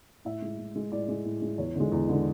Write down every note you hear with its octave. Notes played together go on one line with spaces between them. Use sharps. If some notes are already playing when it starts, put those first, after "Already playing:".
A2 E5
G#3
A2
G#3
A2 D5
G#3
A2
G#3
E2 C#5
D3 G#3
E2
D3 G#3